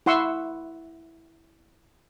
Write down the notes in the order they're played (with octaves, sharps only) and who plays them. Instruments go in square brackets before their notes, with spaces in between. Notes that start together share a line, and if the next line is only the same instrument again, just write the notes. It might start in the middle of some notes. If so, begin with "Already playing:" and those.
[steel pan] E4 F#5 C6 C#6 E6